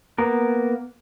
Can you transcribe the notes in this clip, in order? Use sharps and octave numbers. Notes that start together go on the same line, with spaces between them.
A#3 B3 A#4